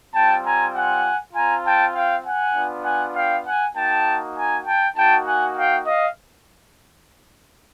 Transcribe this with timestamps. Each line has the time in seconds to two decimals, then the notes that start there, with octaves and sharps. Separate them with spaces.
0.13 G3 C4 F4 G5 A5
0.44 G#5 A#5
0.74 F#5 G#5
1.34 C4 F4 G#5 A#5
1.64 G5 A5
1.94 F5 G5
2.24 F#5 G#5
2.54 B3 D4 F4
2.84 F#5 G#5
3.15 F5 G5
3.45 F#5 G#5
3.74 A#3 D#4 F#4 G5 A5
4.35 G#5 A#5
4.65 G5 A5
4.95 A#3 D#4 F#4 G5 A5
5.25 F#5 G#5
5.55 F5 G5
5.86 D#5 F5